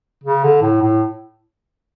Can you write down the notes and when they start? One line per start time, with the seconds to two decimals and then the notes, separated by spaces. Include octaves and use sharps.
0.24 C#3
0.44 D3
0.62 A2
0.82 A2